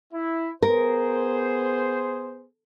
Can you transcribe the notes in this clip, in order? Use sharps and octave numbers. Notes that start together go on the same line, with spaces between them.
E4
B3 G#4 A#4 C5